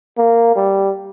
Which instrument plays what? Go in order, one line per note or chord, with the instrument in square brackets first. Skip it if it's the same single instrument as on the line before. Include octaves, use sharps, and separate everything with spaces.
[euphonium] A#3
G3